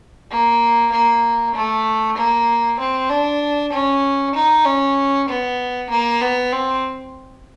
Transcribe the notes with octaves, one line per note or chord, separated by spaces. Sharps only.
A#3
A#3
A3
A#3
C4
D4
C#4
D#4
C#4
B3
A#3
B3
C4